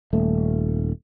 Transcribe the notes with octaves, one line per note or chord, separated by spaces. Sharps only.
D#1 A3